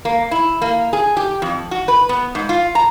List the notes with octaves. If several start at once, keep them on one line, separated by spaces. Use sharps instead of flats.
A#3
E4
A#3
G#4
G4
F2
F#4
B4
B3
G#2
F4
A#5